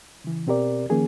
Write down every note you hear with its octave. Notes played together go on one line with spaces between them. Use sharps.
C#3 E3
B2 C4 G4 A#4 D5
D#3 F3 A#3 C#4 G#4 A#4